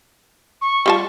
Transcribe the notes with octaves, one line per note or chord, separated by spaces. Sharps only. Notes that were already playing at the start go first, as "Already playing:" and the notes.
C#6
G3 F4 A5